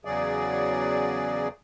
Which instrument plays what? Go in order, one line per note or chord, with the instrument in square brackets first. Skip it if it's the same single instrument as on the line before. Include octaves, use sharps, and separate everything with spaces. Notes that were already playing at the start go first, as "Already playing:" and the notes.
[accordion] E2 C#3 F#3 G#4 D5